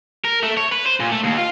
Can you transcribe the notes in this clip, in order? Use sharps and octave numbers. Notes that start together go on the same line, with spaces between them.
A#4
A3
C#5
B4
C5
A#2
A3
D#2
F4